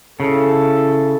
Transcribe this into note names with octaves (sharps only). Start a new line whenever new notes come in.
C#3 E4 A4